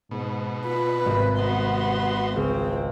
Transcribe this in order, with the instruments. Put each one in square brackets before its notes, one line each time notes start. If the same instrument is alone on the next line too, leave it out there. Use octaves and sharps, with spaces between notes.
[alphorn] G#2 [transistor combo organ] B2
[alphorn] F4 [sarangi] B4
[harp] G#1 [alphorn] C3
[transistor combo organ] B3 F#4 [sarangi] C6
[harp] C#2 [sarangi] C4 [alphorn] G#4